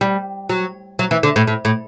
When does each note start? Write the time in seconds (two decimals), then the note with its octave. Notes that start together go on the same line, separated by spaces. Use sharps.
0.01 G3
0.49 F#3
0.99 F#3
1.11 E3
1.23 D3
1.36 A2
1.47 A2
1.65 A2